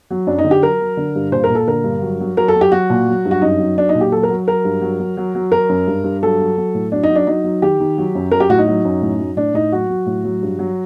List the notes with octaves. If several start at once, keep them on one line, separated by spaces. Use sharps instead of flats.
F#3
F#2 D4
D#4
D3
G4
F#3 A#4
F#3
D3
G2
A#2 C5
A#4
A#2
A4
D3 A#4
G2
F#3
F#3
F#3 A#4
A4
F#3
G4
F#3 F#4
A#2
F#3
G2
F#4
F#2 D#4
F#3
F#3 D4
D#4
A#2
G4
F#3 A4
A#4
F#3
F#3 A#4
G2
F#3
F#3
F#3
F#3
F#3 A#4
F#2
G2
G2
F#3 A4
F#3
F#3
A2
F#3 D4
D#4
F#3
D4
F#3 D#4
F#3
D#3 G4
D#3
F#3
F#2
F#3 A#4
G4
A2 F#4
D#4
F#3
F#2
A2
F#3
A2 D4
A2 D#4
F#3 F#4
F#3
A2
F#3
G2
F#3